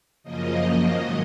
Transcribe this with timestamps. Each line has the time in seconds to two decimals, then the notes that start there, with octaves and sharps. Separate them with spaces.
0.23 F#2 C#3 F3 A#3 D#5
0.86 G#2 D#3 F#3 D#5